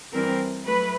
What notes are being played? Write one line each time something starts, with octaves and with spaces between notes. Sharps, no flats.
G2 E3 G3 C4 A#4
F#3 A3 B4